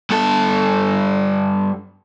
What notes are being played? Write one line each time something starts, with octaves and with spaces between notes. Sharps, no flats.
G2 A4